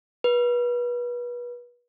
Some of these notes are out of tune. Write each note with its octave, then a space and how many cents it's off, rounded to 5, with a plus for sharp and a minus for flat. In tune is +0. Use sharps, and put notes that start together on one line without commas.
B4 -30